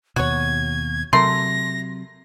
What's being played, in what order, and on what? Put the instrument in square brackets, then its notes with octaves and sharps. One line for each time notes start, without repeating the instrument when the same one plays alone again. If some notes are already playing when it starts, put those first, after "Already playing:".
[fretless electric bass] D#2 B2 [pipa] F#4 C#5 [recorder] G#6
[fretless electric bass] C3 F#3 [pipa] A3 A#4 C6 [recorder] A#6